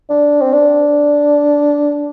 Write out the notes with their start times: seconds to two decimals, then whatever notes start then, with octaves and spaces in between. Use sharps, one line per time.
0.10 D4
0.41 C4
0.53 D4